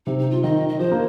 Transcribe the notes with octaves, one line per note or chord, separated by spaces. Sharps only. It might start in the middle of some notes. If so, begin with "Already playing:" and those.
C3 D#4
D#4
F4
D#3 D#5
D#5
F3 C5
A#3